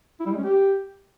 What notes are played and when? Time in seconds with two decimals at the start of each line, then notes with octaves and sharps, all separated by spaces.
0.20 E4
0.26 G3
0.32 G#3
0.38 C#4
0.44 G4